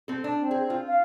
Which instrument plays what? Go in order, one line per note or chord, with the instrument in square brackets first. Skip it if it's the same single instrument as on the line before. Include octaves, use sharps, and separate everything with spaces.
[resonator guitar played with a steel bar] C4 A4
D4
[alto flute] C4
[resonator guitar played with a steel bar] G#4
F4
[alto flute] F5